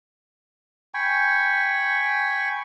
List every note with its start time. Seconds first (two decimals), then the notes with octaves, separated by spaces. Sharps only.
0.94 G5 G#5 B5 C#6